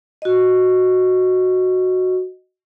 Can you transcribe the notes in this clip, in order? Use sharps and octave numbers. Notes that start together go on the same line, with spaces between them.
F#4 D#5